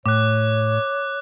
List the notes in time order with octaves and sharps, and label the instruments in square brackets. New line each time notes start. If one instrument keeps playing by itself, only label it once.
[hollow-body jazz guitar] A2 [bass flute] C#5 [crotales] D6 F#6